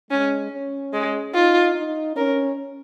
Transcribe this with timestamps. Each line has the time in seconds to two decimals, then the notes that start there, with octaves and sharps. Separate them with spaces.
0.11 G#3 C#4
0.51 C#4
0.93 G#3
1.34 D#4 F4
1.75 D#4
2.16 C#4 A#4